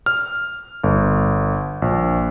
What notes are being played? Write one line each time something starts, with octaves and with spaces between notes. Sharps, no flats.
F6
G1
A#1